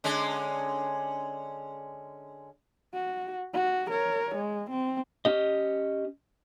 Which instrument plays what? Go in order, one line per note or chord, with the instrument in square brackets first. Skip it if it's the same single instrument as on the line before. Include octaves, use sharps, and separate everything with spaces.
[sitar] D3 G#3 C#4
[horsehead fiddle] F#4
F#4
A#4 C#5
G#3
C4
[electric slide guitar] C#4 G4 D#5